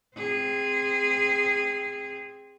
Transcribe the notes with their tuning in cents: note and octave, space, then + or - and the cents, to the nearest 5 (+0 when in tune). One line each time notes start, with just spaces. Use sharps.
C4 +0 G#4 -15